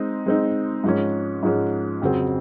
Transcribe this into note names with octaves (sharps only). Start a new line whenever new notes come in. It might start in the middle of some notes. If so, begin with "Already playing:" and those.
Already playing: G#3 C4 D#4
G#3 C4 D#4
G#2 F3 G#3 C#4
G#2 F3 G#3 C#4
F2 C#3 F#3 C4